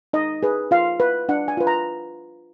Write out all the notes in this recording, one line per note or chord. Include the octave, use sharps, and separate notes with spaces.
D#4 D#5
G#4 B4
F4 F5
B4
D4 F#5
G#5
F4 B4
A#5